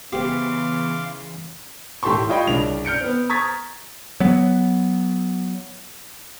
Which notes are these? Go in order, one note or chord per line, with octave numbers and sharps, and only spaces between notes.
C#3 E3 B3 G4 C5 F5 C6 D6
G#1 A2 G4 A5 C6 C#6
F4 C#5 D#5 G5 B5
C2 C#3 D4 F7
F6 G6 C#7 D7
B3 C4
A#5 C#6 D#6 G#6 A6 B6
F#3 B3